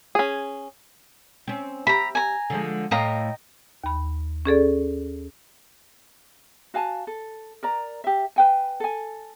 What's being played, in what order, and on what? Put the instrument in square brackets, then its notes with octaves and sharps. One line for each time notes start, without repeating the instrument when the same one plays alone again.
[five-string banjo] C#4 G#4
[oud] C4 C#4
[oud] G4 E5 [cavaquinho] A#5 B5
[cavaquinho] G#5 A#5
[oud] D3 F3 G#3
[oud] A2 F5 [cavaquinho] D#5 G5 A#5
[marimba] D#2 B5
C#4 G#4 A4 D5
[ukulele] F#4 F5 G#5 A5
A4
A#4 D5 A#5
G4 E5
B4 G5 G#5
A4 G#5